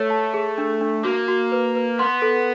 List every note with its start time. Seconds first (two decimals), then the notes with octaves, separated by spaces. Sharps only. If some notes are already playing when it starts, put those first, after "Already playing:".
Already playing: A3 C#5
0.10 A5
0.34 G#4
0.58 D4
0.81 D4
1.04 A#3 F#4
1.28 F#4
1.52 B4
1.75 B4
1.99 B3 C6
2.22 A4